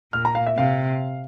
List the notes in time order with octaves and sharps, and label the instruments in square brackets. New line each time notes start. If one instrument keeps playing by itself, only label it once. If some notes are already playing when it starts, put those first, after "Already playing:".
[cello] A#2 [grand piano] F6
[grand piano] A#5
F5
E5
[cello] C3 [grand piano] F5